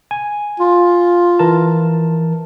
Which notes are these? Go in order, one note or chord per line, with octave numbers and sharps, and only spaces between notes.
G#5
F4
E3 A#4 A5